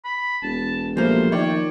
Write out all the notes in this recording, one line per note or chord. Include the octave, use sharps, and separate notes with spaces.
B5
E1 A5
F3 G3 A3 A#3 C5
D#3 F4 C#5 D5 G5